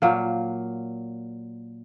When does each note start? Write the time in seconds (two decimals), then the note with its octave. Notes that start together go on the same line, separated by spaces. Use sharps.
0.02 A#2 F#3 A#3